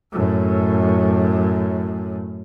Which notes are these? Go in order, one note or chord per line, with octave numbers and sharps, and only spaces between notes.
F#2 A2